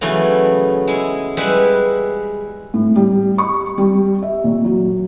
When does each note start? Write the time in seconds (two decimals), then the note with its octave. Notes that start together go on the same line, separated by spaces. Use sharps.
0.01 C#3 E3 F#3 A3 B3
0.88 G#3 E4
1.37 G3 G#3 E4 B4 E5 F#5
2.74 A2
2.96 G3
3.38 C#6
3.78 G3
4.22 E5
4.44 A#2
4.65 F#3